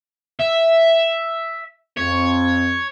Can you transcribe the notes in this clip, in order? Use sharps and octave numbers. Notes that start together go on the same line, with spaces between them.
E5
F2 C#5